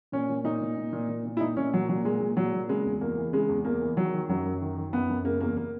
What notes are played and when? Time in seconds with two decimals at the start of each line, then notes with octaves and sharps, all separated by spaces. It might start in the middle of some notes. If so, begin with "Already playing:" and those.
0.12 A#2 C#4
0.29 A#2
0.44 A#2 D#4
0.61 A#2
0.77 A#2
0.93 A#2
1.09 A#2
1.25 A#2
1.37 E4
1.40 A#2 D#4
1.57 A#2 C#4
1.74 A#2 F#3
1.89 A#2 F#3
2.04 A#2 G#3
2.20 A#2
2.37 A#2 F#3
2.53 A#2
2.69 C#3 G#3
2.85 E2
3.01 E2 A#3
3.18 E3
3.33 C#3 G#3
3.49 E2
3.65 E2 A#3
3.81 E3
3.97 D#3 F#3
4.13 D#3
4.29 F#2 F#3
4.45 F#2
4.61 D#3
4.77 D#3
4.93 F#2 B3
5.10 F#2
5.24 C#3 A#3
5.40 E2 A#3
5.57 A#3